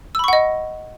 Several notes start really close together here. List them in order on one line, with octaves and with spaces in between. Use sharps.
E6 B5 C#6 F#5 D#5